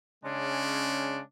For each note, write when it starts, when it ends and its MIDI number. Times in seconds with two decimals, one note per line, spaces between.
0.24 1.20 49
0.24 1.20 56
0.24 1.20 61
0.24 1.20 62